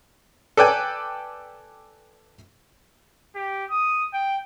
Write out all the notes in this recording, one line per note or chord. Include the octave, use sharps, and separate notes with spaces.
A4 B4 D5 G5 G#5
G4
D#6
G5